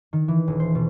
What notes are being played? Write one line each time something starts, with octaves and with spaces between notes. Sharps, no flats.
D#3
E3
D#1
C5
B2